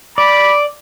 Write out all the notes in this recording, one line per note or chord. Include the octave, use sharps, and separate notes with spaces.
D5 B5 D6